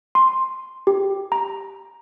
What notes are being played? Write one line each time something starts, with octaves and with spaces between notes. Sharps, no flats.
C6
G4
A#5